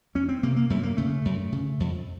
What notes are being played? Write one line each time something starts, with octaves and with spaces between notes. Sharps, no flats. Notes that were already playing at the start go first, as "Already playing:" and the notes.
F2 C#4
C4
C3 A#3
A#3
F#2 A3
A#3
C#3 A3
F#2
C#3
F2